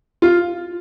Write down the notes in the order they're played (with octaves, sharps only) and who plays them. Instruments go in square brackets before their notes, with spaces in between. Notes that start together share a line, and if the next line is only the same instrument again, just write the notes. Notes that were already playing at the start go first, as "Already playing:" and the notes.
[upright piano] F4